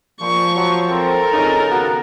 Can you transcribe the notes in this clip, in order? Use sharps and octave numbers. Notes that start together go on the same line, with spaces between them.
A#2 F3 C#6
F#3
C4 A4 A#4
F2 A2 C#3 D#4
D#3 B3 F#4